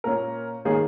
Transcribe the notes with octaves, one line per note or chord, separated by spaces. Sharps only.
A#2 A#3 C#4 A#4
D#3 A#3 C#4 G#4